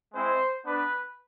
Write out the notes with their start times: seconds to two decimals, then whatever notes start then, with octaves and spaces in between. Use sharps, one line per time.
0.13 G#3 C4 E4 C5
0.65 B3 D4 B4